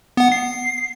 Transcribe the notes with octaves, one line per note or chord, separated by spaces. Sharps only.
B3 F#5
C7